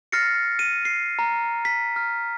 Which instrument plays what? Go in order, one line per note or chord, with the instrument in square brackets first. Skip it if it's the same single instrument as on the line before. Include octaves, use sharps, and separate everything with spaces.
[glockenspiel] F6 A6 A#6 C7 C#7
D#7
C7
A#5
B6
F6